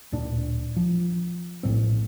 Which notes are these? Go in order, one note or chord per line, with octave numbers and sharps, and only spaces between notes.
D1 A#2 D4
F3
A#1 A2 G3 C4